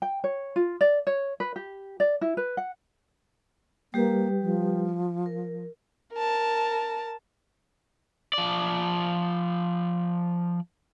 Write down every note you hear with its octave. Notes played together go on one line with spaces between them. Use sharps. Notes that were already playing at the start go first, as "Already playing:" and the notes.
G5
C#5
F4
D5
C#5
B4
G4
D5
E4
B4
F#5
G3 A#3 G4 B4
F3
A#4
A#4 A5
F3 D5